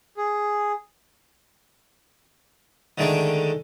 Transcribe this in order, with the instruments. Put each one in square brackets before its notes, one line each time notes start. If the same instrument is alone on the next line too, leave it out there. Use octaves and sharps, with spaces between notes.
[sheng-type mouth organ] G#4
[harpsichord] D3 D#3 G#3 A3 D4